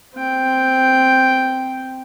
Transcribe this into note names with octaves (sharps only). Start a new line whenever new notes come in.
C4 G5